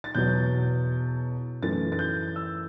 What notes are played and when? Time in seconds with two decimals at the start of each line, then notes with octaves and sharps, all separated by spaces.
0.04 A6
0.15 E2 B2 F#3 G6
1.62 F#2 E3 A3 A6
1.92 A6
1.99 G6
2.36 E6